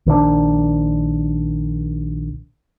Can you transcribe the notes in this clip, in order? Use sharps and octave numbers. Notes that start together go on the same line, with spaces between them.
A#1 D#3 E3 D4